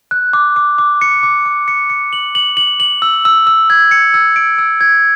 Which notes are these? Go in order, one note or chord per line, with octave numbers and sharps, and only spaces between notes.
F#6
D6
D6
D6
C#7
D6
D6
C#7
C#7
F#7
F#7
F#7
F#7
E6
E6
E6
G#6
C#7
E6
D7
E6
G#6